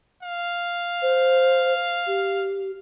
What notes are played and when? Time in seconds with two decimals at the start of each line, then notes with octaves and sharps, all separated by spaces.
0.23 F5
1.02 C5
2.07 G4